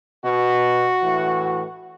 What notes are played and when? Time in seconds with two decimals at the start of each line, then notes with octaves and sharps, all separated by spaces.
0.23 B2 F#4
1.02 A2 E3